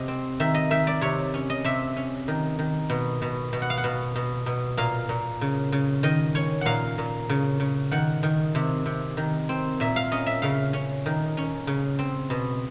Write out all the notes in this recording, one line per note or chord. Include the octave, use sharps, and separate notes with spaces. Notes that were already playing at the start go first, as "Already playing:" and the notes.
Already playing: C3 D#5
C4
D#3 E5
D#5
D#3 E5
D5
C3 C#5
C#4
D#5
C3 E5
C#4
D#3
D#3
B2
B2
B2
F#5
F5
F#5
B2
B2
B2
A#2 F5
A#2
C#3
C#3
D#3 D#5
C#4 C#5
A#2 F5 F#5
A#2
C#3
C#3
D#3 F#5
D#3
C3
C3
D#3
C4
A#2 E5
F5
C#4 D#5
E5
C#3 F5
C#4
D#3
C#4
C#3
C4
B2